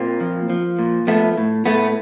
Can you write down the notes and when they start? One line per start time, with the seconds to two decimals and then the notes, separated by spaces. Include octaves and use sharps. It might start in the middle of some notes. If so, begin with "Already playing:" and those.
Already playing: A#2 A#3 C4
0.20 F3
0.50 F3
0.79 A#2
1.07 F3 A3 B3
1.37 A2
1.66 A2 A3 B3